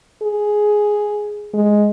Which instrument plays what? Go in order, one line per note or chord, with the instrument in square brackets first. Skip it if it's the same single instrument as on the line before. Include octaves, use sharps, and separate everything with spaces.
[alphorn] G#4
G#3